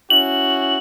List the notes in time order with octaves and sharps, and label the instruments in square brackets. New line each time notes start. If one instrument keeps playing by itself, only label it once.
[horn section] C#4 E4 F#4 [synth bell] F#7